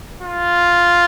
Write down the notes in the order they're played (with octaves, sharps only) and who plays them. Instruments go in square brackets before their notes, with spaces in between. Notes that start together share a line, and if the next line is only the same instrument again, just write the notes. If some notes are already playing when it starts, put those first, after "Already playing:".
[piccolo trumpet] F4